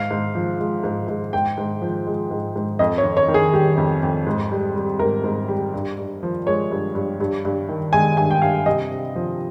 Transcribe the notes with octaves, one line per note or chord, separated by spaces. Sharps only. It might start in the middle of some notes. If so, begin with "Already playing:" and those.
Already playing: G#2 F5
G#2
F3
G#3
G#2
G#2
G#2 G5
G#2
F3
G#3
G#2
G#2
F2 D#5
C#5
F2
C#5
D#3
G#4
G3 G4
F2
F2
G#2
G3
G3
G#2 A#4
G#2
G3
G2
G2
F3
G#3 C#5
G2
G2
G2
G2
D#3
G#3 G#5
G2 G#5
G5
G2 F5
C3 D#5
C3
F3